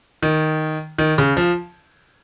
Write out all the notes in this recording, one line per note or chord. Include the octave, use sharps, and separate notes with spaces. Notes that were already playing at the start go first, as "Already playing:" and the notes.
D#3
D#3
C#3
F3